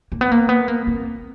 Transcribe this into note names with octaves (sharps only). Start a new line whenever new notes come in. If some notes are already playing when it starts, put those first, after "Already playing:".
A#3
B3
A#3
B3
A#3
C4